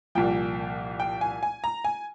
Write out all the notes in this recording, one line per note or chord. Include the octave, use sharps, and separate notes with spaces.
C2 A#2 F3 G5
G5
G#5
G#5
A#5
G#5